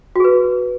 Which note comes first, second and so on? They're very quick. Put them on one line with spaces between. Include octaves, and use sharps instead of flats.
F#4 G#4 B4